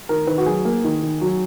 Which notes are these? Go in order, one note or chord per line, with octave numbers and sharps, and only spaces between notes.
D#3 A#4
D#3 B4
F#4
F#3 G#4
A#3
D#3
D#3
F#3